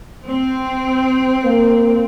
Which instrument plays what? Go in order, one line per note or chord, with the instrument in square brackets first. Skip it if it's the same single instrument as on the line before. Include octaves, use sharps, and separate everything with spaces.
[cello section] C4
[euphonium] A#3